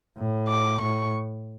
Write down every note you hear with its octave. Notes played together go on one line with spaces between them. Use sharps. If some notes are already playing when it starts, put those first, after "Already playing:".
A2
D6
A2 C#6